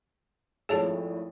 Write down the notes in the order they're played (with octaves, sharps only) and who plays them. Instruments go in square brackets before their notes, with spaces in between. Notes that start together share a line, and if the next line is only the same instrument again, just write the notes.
[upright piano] G#1 A2 F3 [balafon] G#4 C#5 A5